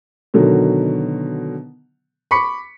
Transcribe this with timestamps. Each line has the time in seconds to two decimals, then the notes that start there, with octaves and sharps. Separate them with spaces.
0.34 B2 D3 D#3 F#3
2.31 B5 C#6 D6 B6 C#7